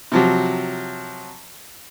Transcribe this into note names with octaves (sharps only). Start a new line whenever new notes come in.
C3 F3 F#3